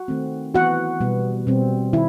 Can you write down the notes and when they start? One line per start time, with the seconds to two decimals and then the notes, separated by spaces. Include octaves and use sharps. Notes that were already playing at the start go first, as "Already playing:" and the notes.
Already playing: F#4 F#5
0.08 D#3 A3 C4
0.55 E3 B3 F#4 F#5
1.01 B2 G3 B3
1.47 B2 G3 C4
1.93 D#3 E4